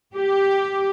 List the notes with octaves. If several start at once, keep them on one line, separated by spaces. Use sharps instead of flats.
G4